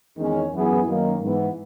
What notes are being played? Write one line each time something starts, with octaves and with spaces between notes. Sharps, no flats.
E2 D#3 G#3 C#4
F#2 E3 B3 E4 G#4
F#2 D#3 A#3
G#2 E3 B3